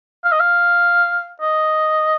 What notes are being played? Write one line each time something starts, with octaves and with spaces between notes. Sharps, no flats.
F5
D#5
F5
D#5